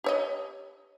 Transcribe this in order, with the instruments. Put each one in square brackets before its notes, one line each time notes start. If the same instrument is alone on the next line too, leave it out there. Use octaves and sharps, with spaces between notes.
[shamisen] G4 C#5 D#5